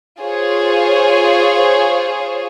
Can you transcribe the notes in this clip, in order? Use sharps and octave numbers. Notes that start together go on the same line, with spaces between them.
F4 G#4 C5 C#5